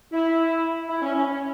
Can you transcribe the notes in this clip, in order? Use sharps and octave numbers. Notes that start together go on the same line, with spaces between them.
E4
E4
C#4
C#4
C#4